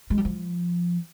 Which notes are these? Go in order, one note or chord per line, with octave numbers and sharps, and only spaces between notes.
G#3
G3
F3